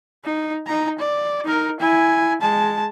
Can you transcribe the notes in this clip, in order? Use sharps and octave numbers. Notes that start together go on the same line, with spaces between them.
D#4
D#4 A#5
D5
D#4 A#4
E4 G#5
G#3 A5